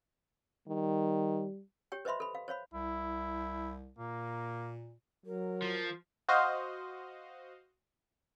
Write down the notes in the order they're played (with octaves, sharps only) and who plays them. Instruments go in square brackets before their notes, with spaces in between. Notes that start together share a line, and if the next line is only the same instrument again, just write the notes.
[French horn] D#3 [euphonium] G3
[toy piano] G4 C#5 G5
B4 C5 D#5 E5 B5 C6
A4 B5
F5
C5 C#5 F5 B5
[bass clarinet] C2 [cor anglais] E4
[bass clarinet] A#2 [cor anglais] A#3
[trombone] F#3 [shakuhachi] A#4
[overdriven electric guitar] F3
[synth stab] F#4 C5 D#5 F5